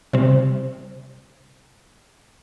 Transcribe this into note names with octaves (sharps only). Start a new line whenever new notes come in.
C3 G3 C4